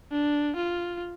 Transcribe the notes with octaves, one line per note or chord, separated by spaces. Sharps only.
D4
F4